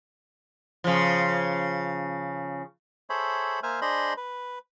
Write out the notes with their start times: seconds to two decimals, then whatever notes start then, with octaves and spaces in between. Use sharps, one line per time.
0.84 C#3 F3
3.10 G#4 A4 C5 C#5 E5 B5
3.63 A#3 C5 E5 G#5 F6
3.81 D4 G#4 C5 D#5 B5 C6
4.17 B4